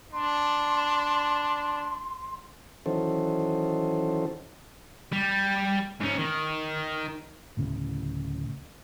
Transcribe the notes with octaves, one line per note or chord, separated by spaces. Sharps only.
D4 C6
D#3 E3 F#3 C#4 A4 C5
G3
G#2 C#4
D#3
D1 A2 C#3